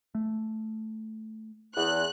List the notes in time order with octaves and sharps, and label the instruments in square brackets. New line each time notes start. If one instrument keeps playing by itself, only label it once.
[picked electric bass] A3
[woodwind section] E2 [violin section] F#6